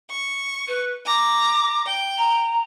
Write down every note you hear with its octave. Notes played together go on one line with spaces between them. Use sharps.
C#6
B4
A#5 D6
G5
A#5